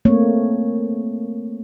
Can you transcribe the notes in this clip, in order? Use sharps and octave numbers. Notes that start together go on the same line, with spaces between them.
A3 A#3 C4 C#5